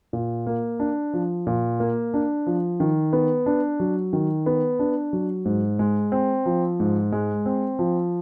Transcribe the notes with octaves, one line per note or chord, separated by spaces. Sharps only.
A#2
A#3
D4
F3
A#2
A#3
D4
F3
D#3
B3
D4
F#3
D#3
B3
D4
F#3
G#2
G#3
C4
F3
G#2
G#3
C4
F3